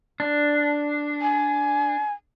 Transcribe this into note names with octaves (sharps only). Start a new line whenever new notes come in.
D4
G#5